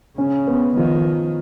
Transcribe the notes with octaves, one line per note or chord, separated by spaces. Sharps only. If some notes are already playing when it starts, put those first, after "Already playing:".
C#3 C#4
B3
D#3 F3